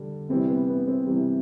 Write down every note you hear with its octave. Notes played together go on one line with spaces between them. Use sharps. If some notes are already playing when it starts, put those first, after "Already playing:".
Already playing: D3 G3
C3 E3 G3 C4
B3
B3
C4
C3 E3 G3